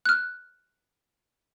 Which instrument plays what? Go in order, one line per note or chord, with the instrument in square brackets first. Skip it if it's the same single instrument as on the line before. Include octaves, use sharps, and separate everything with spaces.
[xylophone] F6 F#6